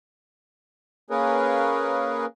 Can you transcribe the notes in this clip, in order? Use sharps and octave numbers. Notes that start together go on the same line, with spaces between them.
A#3 C#4 G#4 A#4 B4 C#5